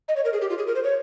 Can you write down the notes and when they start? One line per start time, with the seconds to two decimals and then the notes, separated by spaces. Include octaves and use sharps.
0.08 D#5
0.16 C#5
0.25 A#4
0.33 G#4
0.41 G4
0.50 F4
0.58 G#4
0.67 A#4
0.75 C5
0.84 C#5